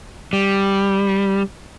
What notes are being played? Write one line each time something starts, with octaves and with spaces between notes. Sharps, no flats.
G3